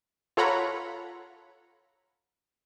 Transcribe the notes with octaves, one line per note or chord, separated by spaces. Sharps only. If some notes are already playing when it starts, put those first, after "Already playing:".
F4 A4 C#5 F#5 A#5 B5